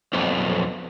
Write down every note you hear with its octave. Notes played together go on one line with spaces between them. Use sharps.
B1 F2